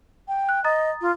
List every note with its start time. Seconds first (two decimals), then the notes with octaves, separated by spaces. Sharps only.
0.28 G5
0.49 F#6
0.64 D#5 A#5 D#6 A6
1.01 F4